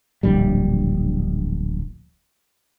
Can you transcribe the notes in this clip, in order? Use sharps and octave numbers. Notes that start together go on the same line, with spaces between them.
D1 A#1 G3